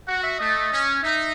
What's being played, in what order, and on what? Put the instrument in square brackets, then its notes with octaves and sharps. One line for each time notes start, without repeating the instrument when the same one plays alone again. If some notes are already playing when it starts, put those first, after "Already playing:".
[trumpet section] F#4 [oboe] F#5
[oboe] E5
[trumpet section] A3 [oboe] D#5
[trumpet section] C#4
[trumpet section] D#4 [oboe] E5